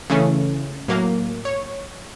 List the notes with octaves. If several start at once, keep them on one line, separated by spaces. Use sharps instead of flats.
C#3 E3 A3 C#4
A2 F#3 A#3
C#5